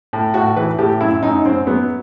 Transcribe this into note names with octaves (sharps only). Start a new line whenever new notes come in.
A2
A2 F#4
E3 B4
A2 G4
F#2 E4
F#2 D#4
F#2 C4
F#3 B3